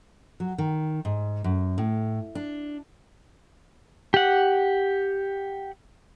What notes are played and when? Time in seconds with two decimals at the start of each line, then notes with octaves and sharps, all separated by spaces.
0.40 F#3
0.58 D#3
1.05 G#2
1.44 F#2
1.78 A2
2.35 D4
4.14 G4 F#5